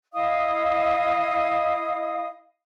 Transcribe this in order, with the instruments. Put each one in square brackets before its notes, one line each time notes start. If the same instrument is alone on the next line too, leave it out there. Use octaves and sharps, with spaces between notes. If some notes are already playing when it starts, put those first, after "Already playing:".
[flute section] E4 D#5 F5 D#6